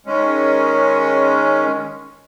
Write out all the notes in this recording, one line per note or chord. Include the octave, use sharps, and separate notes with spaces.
D#3 G#3 C#4